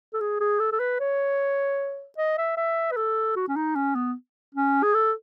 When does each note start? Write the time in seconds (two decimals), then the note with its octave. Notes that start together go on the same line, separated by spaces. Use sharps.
0.14 A4
0.21 G#4
0.40 G#4
0.59 A4
0.72 A4
0.80 B4
1.00 C#5
2.18 D#5
2.38 E5
2.57 E5
2.92 B4
2.97 A4
3.36 F#4
3.48 C#4
3.56 D#4
3.75 C#4
3.95 B3
4.55 C#4
4.83 G#4
4.94 A4